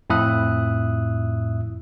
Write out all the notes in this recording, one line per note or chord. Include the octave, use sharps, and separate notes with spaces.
F2 A2 E4 E5 D#6 F#6